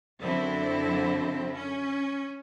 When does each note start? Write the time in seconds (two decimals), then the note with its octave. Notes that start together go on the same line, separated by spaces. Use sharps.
0.22 F#2 D3 C4 E4
1.54 C#4